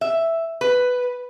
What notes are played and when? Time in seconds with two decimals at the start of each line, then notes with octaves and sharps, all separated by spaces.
0.01 E5
0.61 B4